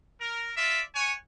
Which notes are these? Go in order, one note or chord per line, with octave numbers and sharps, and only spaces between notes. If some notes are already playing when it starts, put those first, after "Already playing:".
A#4
F4 D5 E5
C#5 F#5 G#5